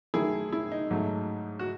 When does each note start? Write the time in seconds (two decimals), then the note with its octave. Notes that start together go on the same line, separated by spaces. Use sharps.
0.14 F#2 D#3 A3 E4 G#4
0.52 E4
0.72 D#4
0.91 G#2 F#3 A3
1.59 F#4